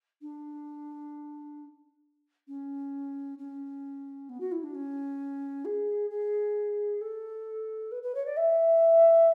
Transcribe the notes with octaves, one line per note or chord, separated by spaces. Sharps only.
D4
C#4
C#4
B3
F#4
E4
D4
C#4
G#4
G#4
A4
B4
B4
C#5
D5
E5